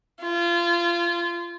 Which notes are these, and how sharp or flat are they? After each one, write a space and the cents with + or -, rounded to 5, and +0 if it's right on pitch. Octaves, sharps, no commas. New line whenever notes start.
F4 -25